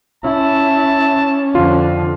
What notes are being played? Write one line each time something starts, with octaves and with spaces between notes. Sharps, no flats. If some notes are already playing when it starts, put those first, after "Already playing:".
C#4 E4 A5
F2 D3 F4